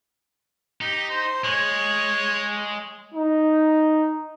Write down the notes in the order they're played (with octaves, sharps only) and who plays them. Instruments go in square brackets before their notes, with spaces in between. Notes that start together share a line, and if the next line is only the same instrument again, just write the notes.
[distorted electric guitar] D#4 [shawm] G4
[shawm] C5
[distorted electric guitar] G#3 [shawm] C#5
[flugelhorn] D#4